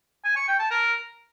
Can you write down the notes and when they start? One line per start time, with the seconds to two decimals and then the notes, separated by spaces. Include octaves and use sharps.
0.25 G#5
0.36 C#6
0.48 G5
0.59 A5
0.71 A#4